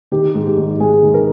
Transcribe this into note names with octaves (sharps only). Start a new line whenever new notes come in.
D#3 G4
G#2
G4
G#1
G#3 G#4
D#3
A#4